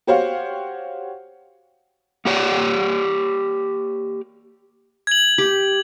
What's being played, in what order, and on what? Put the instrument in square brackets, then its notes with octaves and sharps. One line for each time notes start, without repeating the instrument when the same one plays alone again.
[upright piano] F#4 G4 C5 C#5 F5 F#5
[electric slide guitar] A#3 G4 C#5 D5
[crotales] G#6 F#7
[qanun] G4